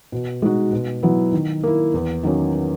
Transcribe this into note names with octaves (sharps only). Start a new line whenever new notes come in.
B2
G#3 D#4 F#4
B2
F#3 B3 E4
D#3
A#3 E4
E2
D#3 F#3 A#3 C#4